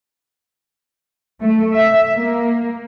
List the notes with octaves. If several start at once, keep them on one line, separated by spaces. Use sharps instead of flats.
A3
E5
A#3